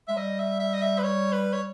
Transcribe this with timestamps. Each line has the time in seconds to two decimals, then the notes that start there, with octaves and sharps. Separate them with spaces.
0.08 G#3 E5
0.17 G3 D#5
0.39 E5
0.60 E5
0.74 D#5
0.81 E5
0.99 B4
1.03 C#5
1.32 B4
1.53 C#5